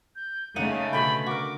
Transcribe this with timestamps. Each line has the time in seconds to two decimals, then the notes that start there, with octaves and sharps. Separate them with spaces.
0.16 G6
0.56 C#3 A3 A#3 D#4 F#5 D#7
0.93 B2 D3 G5 B5
1.27 F#4 A#4 D6